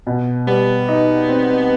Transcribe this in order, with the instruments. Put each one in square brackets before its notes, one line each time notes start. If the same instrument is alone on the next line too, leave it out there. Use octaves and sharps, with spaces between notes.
[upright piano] B2
[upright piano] G3 [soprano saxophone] B3
[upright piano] D#4
C4